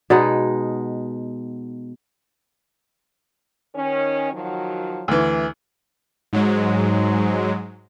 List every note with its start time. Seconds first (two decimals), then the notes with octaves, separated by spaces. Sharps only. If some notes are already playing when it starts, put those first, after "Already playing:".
0.10 B2 G#3 D#4 F#5
3.75 D#3 C#4
4.32 D#3 F3 F#3
5.08 D2 E3
6.33 G#2 F#3 G#3